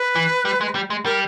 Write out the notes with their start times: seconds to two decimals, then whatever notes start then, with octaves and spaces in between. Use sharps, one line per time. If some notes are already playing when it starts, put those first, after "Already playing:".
Already playing: B4
0.16 E3
0.45 G3
0.61 G#3
0.75 G3
0.90 G#3
1.05 G3 A#4